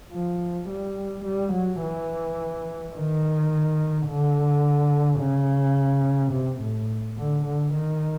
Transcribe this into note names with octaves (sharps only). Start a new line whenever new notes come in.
F3
G3
G3
F#3
E3
D#3
D3
C#3
C3
A2
D3
D3
D#3